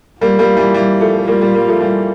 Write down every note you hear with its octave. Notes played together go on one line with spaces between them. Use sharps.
G3 A#3 F4
G3 A#3
E3 G3
E3 G3
F3 A3
A3
G3 A#3 F4
G3 A#3
G3 A#3
F3 A3
E3 G3